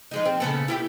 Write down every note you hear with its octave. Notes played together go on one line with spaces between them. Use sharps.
F3 G#3 D#4
C4
C#3 B3 A4
E4 F#4 G4